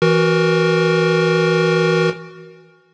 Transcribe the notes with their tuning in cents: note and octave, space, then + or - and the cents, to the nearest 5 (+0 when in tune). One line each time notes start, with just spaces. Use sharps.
E3 +0 F#4 +0 A#4 +15